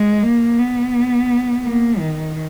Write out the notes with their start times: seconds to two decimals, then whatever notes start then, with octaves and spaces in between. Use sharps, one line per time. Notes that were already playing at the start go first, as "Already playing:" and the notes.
Already playing: G#3
0.23 A#3
0.59 B3
1.64 A#3
1.99 D#3